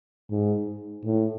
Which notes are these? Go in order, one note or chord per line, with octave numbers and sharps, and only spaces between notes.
G#2
A2